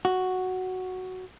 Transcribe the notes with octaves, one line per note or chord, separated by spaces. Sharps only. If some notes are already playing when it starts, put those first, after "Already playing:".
F#4